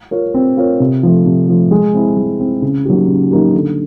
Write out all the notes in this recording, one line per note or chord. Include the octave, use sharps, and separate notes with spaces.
F4 A#4 C#5
C4
F4 A#4 C#5
C3
F3 A3
C3
F3 A3
G#3
C4 E4
G#3
C4 E4
C#3
F#3 A#3 D#4 G4
C#3
F#3 A#3 D#4 G4
D3